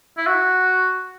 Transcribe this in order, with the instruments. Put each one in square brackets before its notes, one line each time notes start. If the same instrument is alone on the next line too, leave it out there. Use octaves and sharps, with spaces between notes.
[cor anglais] E4
F#4